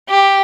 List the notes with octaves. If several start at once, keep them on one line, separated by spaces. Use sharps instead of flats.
G4